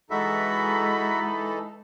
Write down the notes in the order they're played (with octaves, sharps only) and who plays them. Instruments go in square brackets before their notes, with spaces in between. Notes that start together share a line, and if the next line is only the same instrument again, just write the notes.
[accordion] E3 D#4 A4 [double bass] G#3 [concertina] F#4 E5 [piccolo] B5